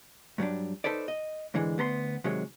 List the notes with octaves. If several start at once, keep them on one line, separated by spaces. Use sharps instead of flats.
G2 F#3 G3 D4
D#4 A4 B4 C5 D5
D#5
G#2 D3 E3 G#3
D2 B3 A#5 C6
C3 D#3 F#3 G#3